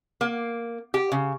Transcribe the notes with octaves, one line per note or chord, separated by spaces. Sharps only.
A#3
G4
C#3